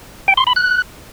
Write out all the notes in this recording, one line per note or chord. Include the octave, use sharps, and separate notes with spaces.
G5
C6
B5
F#6